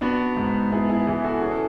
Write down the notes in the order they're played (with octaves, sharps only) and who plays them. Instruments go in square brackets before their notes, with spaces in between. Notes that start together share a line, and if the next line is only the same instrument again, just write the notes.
[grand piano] B3 [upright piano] D4 F#4
[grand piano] G#2
[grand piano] B3 [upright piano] E4 G#4
[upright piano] E4 G#4
[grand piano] E3 [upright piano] E4 G#4
[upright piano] F#4 A4
[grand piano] C#4 [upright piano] G#4
[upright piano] A4